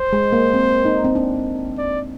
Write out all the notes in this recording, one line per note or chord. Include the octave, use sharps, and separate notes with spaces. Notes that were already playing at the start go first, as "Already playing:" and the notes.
Already playing: C5
G#3
A#3
C4
D#4
C4
D4
D5